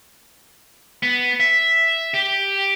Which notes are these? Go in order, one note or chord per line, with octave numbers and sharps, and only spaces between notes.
B3
E5
G4